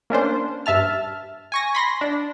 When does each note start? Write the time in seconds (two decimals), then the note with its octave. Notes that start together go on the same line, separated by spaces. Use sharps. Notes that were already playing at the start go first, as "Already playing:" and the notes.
0.10 A#3 C#4 D4 C5
0.66 G2 E5 A5 F6
1.52 G#5 C#6 A#6
1.75 B5 C6 A#6
2.01 D4